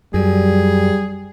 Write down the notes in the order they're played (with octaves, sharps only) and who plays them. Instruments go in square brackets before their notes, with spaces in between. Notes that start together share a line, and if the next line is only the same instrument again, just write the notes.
[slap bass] F#2 [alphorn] G3 [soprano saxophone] G#4